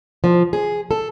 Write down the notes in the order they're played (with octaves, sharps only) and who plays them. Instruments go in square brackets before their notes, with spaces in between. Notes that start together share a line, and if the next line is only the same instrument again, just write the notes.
[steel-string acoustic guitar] F3
G#4
A4